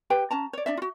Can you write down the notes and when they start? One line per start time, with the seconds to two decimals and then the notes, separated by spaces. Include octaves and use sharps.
0.10 G4 B4 G5
0.31 C#4 A5 A#5
0.53 C#5 D5
0.66 D4 D5 E5
0.77 F4 F#4